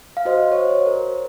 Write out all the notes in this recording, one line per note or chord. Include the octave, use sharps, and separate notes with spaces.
F5
F#4 C5 D#5
C#5
C5
F#4
A#4